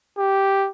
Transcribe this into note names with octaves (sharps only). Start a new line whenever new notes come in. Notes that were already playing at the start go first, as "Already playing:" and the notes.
G4